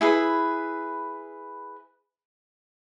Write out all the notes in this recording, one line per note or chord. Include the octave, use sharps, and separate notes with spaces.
E4 G#4 B4